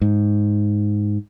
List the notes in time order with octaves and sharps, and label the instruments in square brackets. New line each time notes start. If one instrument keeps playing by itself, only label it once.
[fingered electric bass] G#2